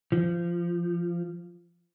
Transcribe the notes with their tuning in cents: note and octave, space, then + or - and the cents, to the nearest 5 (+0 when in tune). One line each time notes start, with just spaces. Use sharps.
F3 -20